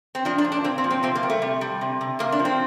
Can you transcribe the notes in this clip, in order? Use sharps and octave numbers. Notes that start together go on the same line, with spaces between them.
C4
F3 D4
D4
A#2
D4
A#2 C4
C4
F3
C4
C3 C4
A#3
G3
A3
C3
G3
C3
C3
C3 A#3
D4
F3
C4